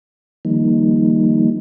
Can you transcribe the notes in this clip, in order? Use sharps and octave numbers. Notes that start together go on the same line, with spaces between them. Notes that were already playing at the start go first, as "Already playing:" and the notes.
D#3 F3 G3 A#3 D#4